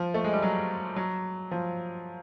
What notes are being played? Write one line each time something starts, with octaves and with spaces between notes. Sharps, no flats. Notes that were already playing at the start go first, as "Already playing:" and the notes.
Already playing: F3
A3
G#3
G3
F#3
F#3
F3